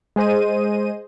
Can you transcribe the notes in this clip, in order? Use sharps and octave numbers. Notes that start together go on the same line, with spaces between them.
G#3 G#4 C5 D#5 D#7